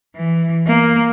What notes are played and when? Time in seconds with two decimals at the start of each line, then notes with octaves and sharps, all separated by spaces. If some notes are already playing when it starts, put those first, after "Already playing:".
0.16 E3
0.67 A#3